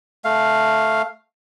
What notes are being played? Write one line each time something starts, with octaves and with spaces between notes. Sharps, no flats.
A3 F5